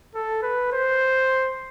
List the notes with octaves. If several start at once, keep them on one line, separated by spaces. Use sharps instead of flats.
A4
B4
C5